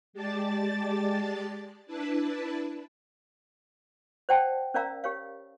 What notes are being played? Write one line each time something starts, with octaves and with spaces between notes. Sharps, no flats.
G#3 G4 D5 A5 A6
D4 E4 B4 A5
C5 D5 F#5 G5 A5
C#4 A#4 D5 F5 A#5 E6
G4 A#4 C#5 F5